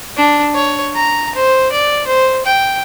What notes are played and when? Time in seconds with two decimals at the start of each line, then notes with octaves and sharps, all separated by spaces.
0.17 D4
0.55 C#5
0.95 A#5
1.35 C5
1.72 D5
2.07 C5
2.46 G5